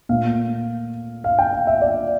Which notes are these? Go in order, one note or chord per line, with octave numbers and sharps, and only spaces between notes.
A#2 A3 F5
F5
G5
F5
E5
D5